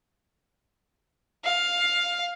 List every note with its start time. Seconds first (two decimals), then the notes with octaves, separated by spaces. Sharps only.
1.44 F5